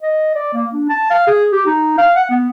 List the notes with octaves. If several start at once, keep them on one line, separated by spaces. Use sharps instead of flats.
D#5
D5
A#3
D4
A5
F5
G#4
G4
D#4
F5
F#5
B3